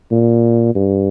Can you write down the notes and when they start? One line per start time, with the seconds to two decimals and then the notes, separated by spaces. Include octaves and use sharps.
0.11 A#2
0.75 G2